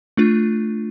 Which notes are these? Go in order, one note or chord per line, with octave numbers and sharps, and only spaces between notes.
A3 D4 F4